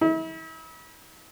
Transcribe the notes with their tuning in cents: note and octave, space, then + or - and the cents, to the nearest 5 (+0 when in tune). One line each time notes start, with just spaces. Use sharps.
E4 -40